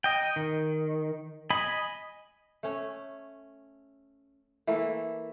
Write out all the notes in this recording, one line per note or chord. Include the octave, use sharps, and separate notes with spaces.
D#5 G5
D#3
D#5 G#5 B5
A3 C#4
E3 A3 A#3 E4